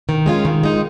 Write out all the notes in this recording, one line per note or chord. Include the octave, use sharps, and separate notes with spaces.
D#3
G#3 C#4 F4
D#3
G#3 D#4